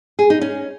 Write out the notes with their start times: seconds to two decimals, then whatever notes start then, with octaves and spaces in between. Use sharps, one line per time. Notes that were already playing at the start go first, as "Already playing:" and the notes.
0.19 G#4
0.30 D#4
0.41 C#4